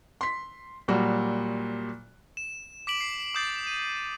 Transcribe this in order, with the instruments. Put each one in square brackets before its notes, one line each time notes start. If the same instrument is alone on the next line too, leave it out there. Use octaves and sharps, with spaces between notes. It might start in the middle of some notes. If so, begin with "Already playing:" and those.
[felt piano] C6 B6
A#2 F#3 G3 F#4
[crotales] E7
D6 B6 D7 F#7
C7
D6 D#6 G6 A6 C7
D#7